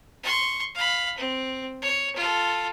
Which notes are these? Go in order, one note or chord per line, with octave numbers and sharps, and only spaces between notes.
C6 C#6
F5 B5
C4
C#5
F4 A4